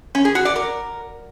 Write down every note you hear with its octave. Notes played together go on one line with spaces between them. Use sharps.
C#4
G#4
F#4
D5
A#4